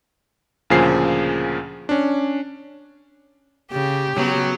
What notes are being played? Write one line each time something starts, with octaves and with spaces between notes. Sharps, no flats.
D2 A#2 C#3 F3 G#4 C7
C#4 D4
C#3 G4
C#3 F#3 B3